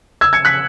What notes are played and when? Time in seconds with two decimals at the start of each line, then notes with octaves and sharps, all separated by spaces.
0.21 E6 G#6
0.33 G#6 C#7
0.45 F#6 B6